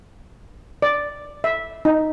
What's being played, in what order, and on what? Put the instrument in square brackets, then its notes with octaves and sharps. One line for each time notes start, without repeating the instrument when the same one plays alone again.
[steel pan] D5
E5
D#4